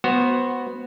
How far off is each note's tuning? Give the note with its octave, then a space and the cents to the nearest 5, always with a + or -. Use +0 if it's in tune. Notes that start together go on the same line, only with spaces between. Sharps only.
B3 +0 F#4 +0 C5 +15